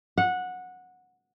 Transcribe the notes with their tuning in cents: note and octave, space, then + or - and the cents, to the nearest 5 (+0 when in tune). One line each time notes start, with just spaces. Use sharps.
F#5 -15